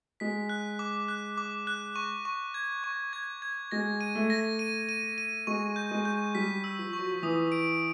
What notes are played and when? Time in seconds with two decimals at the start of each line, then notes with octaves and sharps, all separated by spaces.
0.20 G#3 B6
0.49 F#6
0.79 D6
1.08 F#6
1.38 D6
1.67 F#6
1.96 C#6
2.25 C#6
2.54 G#6
2.84 C#6
3.13 G#6
3.42 G#6
3.71 G#3 A#6
4.01 D#7
4.15 A3
4.30 A#6
4.59 D#7
4.89 D#7
5.18 D#7
5.47 G#3 C#6
5.76 G6
5.91 G#3
6.05 G6
6.35 G3 B6
6.64 E6
6.78 F3
6.93 C#6
6.99 F#3
7.12 F3
7.22 E3 D#6
7.52 D7